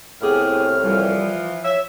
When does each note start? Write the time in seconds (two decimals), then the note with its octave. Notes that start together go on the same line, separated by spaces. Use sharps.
0.22 C2 A2 B3 G4 G#4 F6
0.83 E3 F3 G3
1.64 C#5 E5